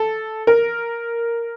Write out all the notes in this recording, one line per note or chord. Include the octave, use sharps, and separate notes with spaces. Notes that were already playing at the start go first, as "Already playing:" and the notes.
Already playing: A4
A#4